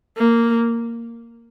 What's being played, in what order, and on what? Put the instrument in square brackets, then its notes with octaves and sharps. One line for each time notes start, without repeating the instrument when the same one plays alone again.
[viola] A#3